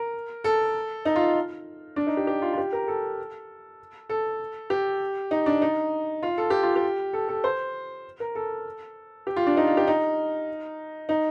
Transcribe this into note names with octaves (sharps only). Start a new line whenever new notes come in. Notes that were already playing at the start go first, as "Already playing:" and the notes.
Already playing: A#4
A4
D#4
F4
D4
D#4
G4
G4
F4
F4
G4
A#4
A4
A4
G4
D#4
D4
D#4
F4
A4
G4
F4
G4
A4
A4
C5
A#4
A4
G4
F4
D4
D#4
F4
G4
D#4
D#4